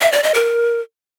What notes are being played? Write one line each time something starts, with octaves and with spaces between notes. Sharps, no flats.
E5
D5
D#5
A#4